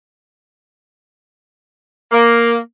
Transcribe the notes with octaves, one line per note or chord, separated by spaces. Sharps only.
A#3